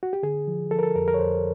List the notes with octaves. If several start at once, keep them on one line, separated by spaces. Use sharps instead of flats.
F#4
G4
D3 G#4
F3
F3 A4
A#4
A4
F2 A#4
A#4
C#5
F2 C5